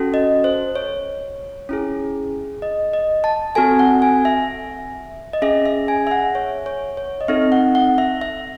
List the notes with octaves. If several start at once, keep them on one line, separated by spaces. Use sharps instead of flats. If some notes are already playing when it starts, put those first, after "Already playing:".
Already playing: C#4 F#4 A4
D#5
C5
C#5
C#4 E4 G#4
D#5
D#5
A5
C4 F#4 A4 G#5
F#5
G#5
E5
D#5
C#4 G#4 E5
E5
G#5
E5
F#5
C#5
C#5
C#5
D#5
C4 D#4 A4 E5
F#5
F#5
E5
E5